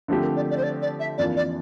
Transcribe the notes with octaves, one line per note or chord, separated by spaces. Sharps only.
D3 F3 A3 C4 G4
A#4
D5
D5
C5
D5
D5
E5
F2 E3 A#3 D4 F4 D5
D5